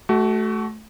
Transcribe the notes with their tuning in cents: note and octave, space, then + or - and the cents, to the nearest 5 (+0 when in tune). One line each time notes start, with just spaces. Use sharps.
A3 -20 F#4 +25